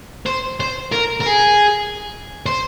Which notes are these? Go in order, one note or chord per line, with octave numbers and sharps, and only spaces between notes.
C5
C5
A#4
A#4
G#4
C5